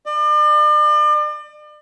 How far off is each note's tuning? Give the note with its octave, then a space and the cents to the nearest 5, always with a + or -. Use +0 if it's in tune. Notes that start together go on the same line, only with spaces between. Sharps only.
D5 +40